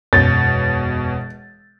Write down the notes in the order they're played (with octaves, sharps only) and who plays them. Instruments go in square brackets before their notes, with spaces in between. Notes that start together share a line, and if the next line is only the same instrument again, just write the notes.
[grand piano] E1 G6 [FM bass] F#2 [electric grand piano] B2 C#5 [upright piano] A6